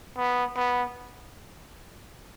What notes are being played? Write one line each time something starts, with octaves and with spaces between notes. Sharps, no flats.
B3
B3